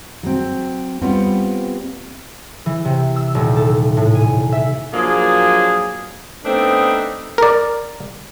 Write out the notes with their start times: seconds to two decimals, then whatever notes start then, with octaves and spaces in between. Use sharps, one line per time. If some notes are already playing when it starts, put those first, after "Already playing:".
0.23 F#3 C4
1.01 G3 B3 C4 F4 B4 C#5
2.66 E3
2.85 C3
3.16 E6
3.35 D#1
3.56 A4
3.97 A2
4.15 G#5
4.52 E5
4.93 F3 F#3 A#3 D4 G#4
6.45 A3 B3 C4 D4 D#4
7.38 A#4 D5